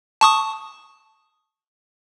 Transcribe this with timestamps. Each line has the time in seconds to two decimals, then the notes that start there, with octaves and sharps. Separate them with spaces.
0.21 A5 C#6 D#6